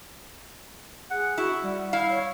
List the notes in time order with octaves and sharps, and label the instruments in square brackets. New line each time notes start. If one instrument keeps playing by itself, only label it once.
[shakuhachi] G#4 [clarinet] F#5
[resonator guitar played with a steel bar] E4 [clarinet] F#4
[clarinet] G3 [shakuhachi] F#5
[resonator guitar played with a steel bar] E4 F5
[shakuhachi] C#5